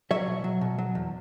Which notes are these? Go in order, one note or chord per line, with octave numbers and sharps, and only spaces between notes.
F#3 C#5 E5
B2
F#3
B2
F#3
E2